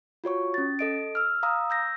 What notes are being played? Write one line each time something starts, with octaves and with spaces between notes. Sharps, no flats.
F4 F#4 C#5 C#6
C#4 A6
A4 D#5 D7
E6 F6
F5 A#5 D#6 E6
E6 G6 A#6